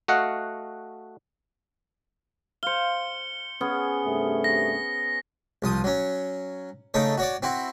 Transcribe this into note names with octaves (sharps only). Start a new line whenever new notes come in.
A3 F#4 D#5 F5 F#5
C5 F5 C#7 G7
B3 C#4 G#4
G2 C3 A3
A#6
C2 F3 D#6
F#3 C#4
C#3 A3 D#4 A4 C#5
F#4 C#5 D5
C4 E4 F#4